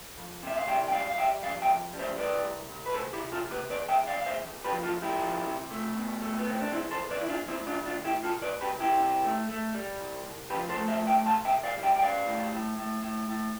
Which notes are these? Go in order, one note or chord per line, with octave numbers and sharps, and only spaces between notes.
F2
C3 E5
F5
G3 E5 G5
G5
G3 D5 F5
F5
G3 E5 G5
F2 D5 F5
E5 G5
F2
G3
C5 E5
C2 B4 D5
C2
C2
B4
C3 A4 C5
E4 G4
C3
F4 A4
C3
G4 B4
E2 B4 D5
E5 G5
E2
D5 F5
E2 F5
C5 E5
B1
G4 B4
F3
F4 A4
B1
E4 G4
F3
C3
A3
B2
A3
B3
C2 C4
D4
E2 C4 E4
A4 C5
E2
B4 D5
E2 E4
D4 F4
D2 C4 E4
D4 F4
D2
D4 F4
D2
E4 G4
C2 F4 A4
B4 D5
B2
G4 B4
C2
E4 G4
C3
A3
A3
G3
C2
C2
F3 G4 B4
A4 C5
A3
C5 E5
G2
E5 G5
C2 F5 A5
E5 G5
C2
D5 F5
G3
E5 G5
G5
G3 D5 F5
A2
A2
A2
A2
A2